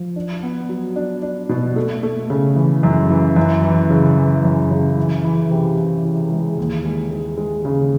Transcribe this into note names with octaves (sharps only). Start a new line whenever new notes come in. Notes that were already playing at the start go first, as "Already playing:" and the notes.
Already playing: F3
D4
B3
F#3
D4
D4
B2
A3
A3
C#3
E3
F#2
E3
F#2
E3
C#3
E3
F#2
C#3
E3
E3
C3
E3
E3
G#3
D#2
G#3
G#3
G#3
C#3